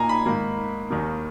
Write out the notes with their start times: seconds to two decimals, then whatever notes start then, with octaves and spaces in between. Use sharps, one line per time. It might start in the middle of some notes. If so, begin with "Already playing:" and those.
Already playing: A#2 A#3 D#4 G#5 A#5
0.09 B5
0.26 G#2 D#3 A#3
0.90 D#2 D#3 A#3 D#4